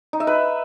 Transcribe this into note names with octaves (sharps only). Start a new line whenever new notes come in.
D#4
E5
B4